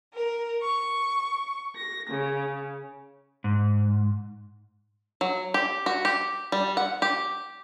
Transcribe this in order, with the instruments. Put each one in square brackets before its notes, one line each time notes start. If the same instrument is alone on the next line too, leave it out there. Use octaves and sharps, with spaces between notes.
[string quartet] A#4
C#6
A#6
C#3
[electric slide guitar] G#2
[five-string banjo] F#3
G4
F#4
G4
G3
F#5
G4